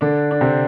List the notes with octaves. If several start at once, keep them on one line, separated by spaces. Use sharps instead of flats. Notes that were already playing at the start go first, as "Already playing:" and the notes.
D3 D4
D4
C3 C4